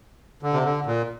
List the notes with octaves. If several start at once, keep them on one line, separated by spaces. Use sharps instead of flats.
D3
C3
D3
A#2